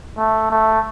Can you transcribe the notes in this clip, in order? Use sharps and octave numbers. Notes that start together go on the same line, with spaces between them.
A3
A3